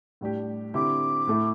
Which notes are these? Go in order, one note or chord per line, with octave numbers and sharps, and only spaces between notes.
A2 G3 D4 G4
D3 C4 E4 G4 D6
A2 A3 E4